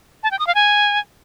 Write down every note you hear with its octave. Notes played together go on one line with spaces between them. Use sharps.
A5
G5
D#6
F5
G#5